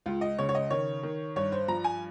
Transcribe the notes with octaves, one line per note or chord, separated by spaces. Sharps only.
C#2 F4
D#5
C#3 C#5
C#5
D#5
D#3 C#5
D#3
G2 C#5
C5
F3 A#5
G#5